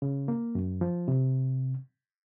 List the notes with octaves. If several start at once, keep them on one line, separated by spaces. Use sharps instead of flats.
C#3
A#3
F#2
F3
C3